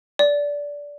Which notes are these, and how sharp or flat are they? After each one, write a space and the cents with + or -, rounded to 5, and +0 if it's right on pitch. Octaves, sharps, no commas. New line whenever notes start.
D5 -15